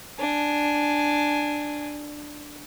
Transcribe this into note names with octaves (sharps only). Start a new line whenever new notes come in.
D4 G#5